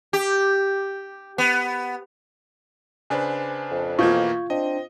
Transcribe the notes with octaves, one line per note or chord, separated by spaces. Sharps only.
G4
B3
C#3 D4 B4 C5 G#5
F2
B2 E3 A#3 F4 C#6 G6 G#6
C4 D4 D#5